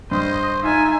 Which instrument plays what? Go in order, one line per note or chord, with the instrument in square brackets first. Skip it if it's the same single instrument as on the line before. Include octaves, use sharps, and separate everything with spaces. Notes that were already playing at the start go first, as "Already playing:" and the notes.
[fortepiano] G2 [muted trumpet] C5 [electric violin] D#5
[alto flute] D#4 [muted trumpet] F4 [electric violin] E5 G#5